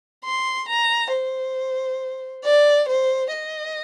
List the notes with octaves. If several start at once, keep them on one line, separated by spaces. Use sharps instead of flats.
C6
A#5
C5
D5
C5
D#5